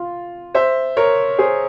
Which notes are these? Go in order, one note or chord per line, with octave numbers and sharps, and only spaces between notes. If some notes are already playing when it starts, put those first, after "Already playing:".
Already playing: F4
C5 E5
A#4 C#5
G#4 C5